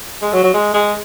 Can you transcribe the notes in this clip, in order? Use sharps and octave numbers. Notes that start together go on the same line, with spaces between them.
G#3
F#3
F#3
G#3
G#3